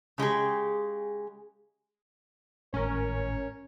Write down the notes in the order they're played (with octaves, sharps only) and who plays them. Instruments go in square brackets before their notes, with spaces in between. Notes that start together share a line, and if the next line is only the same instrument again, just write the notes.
[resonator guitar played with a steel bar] C#3 G#3 G4 G#4
[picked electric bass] G#1 A2 [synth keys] C#4 A#4 [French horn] C#5